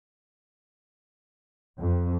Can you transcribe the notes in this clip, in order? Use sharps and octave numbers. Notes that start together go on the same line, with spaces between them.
F2